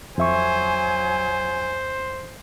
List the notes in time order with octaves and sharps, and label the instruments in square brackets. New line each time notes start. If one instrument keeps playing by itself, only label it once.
[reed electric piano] F2 E5 C#6 [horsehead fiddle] F#3 G#5 [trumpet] C5